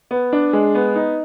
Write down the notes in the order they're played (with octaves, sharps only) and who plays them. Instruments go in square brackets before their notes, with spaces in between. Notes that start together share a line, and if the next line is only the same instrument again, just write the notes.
[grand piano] B3
D4
G#3
B3
D#4